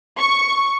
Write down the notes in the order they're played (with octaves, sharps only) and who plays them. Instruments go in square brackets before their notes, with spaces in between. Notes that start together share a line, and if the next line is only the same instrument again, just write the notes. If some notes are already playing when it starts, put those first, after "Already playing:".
[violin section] C#6